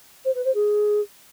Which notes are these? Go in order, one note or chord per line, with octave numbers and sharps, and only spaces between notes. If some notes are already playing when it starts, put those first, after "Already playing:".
C5
B4
C5
G#4